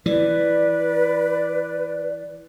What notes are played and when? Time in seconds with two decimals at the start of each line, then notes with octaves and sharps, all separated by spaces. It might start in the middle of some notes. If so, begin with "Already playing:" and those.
0.06 E3 B4 D5